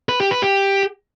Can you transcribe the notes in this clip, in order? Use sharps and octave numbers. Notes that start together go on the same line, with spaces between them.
B4
G4
B4
G4